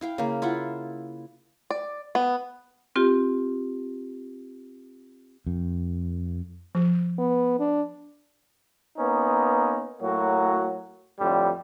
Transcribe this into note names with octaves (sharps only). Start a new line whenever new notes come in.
E4 F5 G5
C#3 A#3
E4 F4 E5 F#5
D5
B3
C4 F4 G4
F2
F3
B3
D4
A#3 B3 C#4 D#4
A2 F#3 A#3 F#4
F2 A2 D3 G3